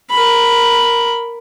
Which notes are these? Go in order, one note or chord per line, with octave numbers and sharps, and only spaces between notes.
A#4 B5